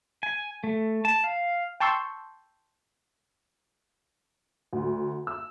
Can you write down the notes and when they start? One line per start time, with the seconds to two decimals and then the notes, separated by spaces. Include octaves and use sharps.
0.23 G#5
0.64 A3
1.05 A5
1.24 F5
1.80 G5 A5 C6 C#6 E6 G6
4.73 D2
5.27 E6